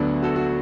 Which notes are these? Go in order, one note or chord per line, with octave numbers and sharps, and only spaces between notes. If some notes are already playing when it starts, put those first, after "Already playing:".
Already playing: D2 D3 F#3 B3 D4
F#4 A4
F#4